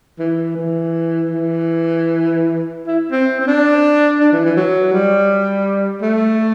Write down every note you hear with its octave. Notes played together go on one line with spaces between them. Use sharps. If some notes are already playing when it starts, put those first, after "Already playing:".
E3
E3
E3
E4
C4
C4
D4
D4
E3
E3
F#3
G3
A3